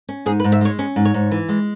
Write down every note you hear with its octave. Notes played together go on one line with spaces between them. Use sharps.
C#4
G#2 G#4
B4
G#2
E5
G#3 C#5
C#4
G#2
C#5
G#2
E3
G#3